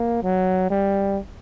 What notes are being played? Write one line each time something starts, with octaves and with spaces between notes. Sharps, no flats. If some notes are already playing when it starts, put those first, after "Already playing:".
Already playing: A#3
F#3
G3